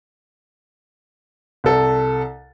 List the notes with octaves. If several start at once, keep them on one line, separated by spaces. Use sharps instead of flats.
C2 A4